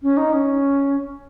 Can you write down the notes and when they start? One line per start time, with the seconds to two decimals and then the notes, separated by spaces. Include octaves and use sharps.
0.02 C#4
0.17 D#4
0.33 C#4